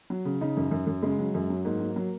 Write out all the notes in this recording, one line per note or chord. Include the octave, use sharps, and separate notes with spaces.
F#3
C#3
C#3 D#4
F#2
F#2
F#2
C#3 G#3
F#3
F#2
F#3
G#2 A#3
F#3
F#3